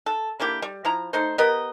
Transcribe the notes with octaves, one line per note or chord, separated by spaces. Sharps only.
A4
D3 A#3 E4 G4
G3
F3 E4 A#5
A3 D#4 C5
B3 G4 A#4 D#5